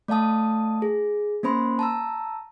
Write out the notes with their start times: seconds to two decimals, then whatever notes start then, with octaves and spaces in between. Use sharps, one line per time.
0.08 A3 D5 F5 A5 D#6
0.82 G#4
1.43 A#3 C#4 C5 B5 C6
1.79 A5 A#5 E6